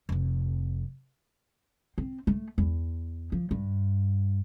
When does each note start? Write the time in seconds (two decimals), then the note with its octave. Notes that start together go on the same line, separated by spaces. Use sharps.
0.09 F1 F2
1.98 C4
2.27 A3
2.58 E2
3.32 F3
3.51 G2